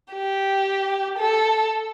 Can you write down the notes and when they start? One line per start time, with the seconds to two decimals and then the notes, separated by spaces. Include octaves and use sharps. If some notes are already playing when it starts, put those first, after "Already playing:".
0.13 G4
1.18 A4